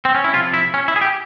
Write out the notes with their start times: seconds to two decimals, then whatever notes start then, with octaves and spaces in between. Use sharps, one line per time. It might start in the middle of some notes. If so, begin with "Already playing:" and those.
0.05 C4
0.15 C#4
0.24 E4
0.33 C3 F4
0.37 F3
0.54 E4
0.74 C#4
0.88 E4
0.96 G#4
1.01 G4